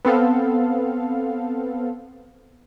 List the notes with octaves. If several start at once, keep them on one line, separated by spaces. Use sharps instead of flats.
B3 C4 A4 F5